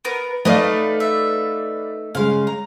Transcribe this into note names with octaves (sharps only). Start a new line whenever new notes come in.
B3 A#4 B4
A3 D#4 B4 D5 D#5 F5 A5 D#6
E5
C#3 G#3 F5 C6
A#5